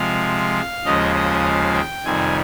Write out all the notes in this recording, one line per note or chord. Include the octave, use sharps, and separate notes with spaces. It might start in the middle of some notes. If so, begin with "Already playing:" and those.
Already playing: C3 F3 G#3 F5
D#2 C#3 F3 G#3 D#5
D#5
F5
G5
F2 C3 D#3 G3 G#5